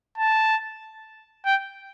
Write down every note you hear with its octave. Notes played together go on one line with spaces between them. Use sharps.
A5
G5